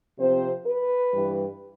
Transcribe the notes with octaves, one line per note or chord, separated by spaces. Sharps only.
C3 F3 C4 C5
B4
G2 E3 G3